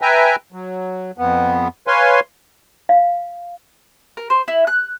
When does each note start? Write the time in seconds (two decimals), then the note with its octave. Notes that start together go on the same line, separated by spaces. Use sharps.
0.02 B4 E5 G5 G#5 A#5
0.52 F#3
1.18 F2 B3
1.87 B4 C#5 F5 G#5 C6
2.89 F5
4.17 A#4
4.30 C5
4.48 E4
4.67 F#6